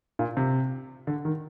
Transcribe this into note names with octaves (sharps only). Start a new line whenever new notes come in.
A#2
C3
D3
D#3